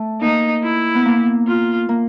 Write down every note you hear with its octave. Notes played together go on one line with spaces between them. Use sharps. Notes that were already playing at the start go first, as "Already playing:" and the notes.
Already playing: A3
A#3 D#4
E4
B3
A#3
F4
A#3